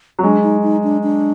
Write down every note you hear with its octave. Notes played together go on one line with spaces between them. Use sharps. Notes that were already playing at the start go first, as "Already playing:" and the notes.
F#3
G#3 D4
D#4
D#4
D4
D4